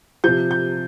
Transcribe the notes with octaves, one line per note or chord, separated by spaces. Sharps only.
C3 F3 G6
G6